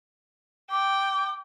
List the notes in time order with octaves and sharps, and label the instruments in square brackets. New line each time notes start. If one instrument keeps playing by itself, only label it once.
[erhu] G5 [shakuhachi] D6